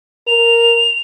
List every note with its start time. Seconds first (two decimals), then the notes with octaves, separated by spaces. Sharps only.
0.27 A#4 F7